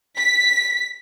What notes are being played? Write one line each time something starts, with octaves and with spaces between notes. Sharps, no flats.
B6